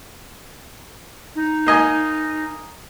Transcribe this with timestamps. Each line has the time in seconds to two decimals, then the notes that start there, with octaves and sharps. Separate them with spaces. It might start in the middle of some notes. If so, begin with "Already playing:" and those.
1.35 D#4
1.67 A#3 D#5 G#5